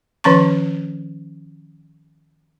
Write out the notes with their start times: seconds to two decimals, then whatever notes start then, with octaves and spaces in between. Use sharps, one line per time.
0.24 D#3 F3 C#4 A#5 C#6